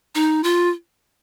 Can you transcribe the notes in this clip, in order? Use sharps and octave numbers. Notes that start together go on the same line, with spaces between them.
D#4
F4